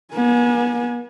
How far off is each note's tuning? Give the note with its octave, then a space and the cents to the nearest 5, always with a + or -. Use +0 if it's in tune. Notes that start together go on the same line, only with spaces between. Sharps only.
B3 -40 G#5 +0